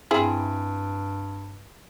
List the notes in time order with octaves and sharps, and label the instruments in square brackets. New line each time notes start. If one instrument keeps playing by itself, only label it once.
[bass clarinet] G2 [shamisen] C4 E4 G#4